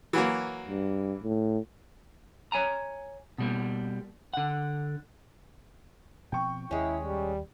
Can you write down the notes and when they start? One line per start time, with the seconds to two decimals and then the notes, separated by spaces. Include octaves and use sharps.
0.13 E3 F#3 A#3
0.66 G2
1.23 A2
2.52 C#5 G#5 A#5
3.38 B2 G3 A#3
4.34 D3 F#5
6.32 B2 F3 C4 G5 C#6
6.71 D#2 G#3 C#4 E4
7.04 G3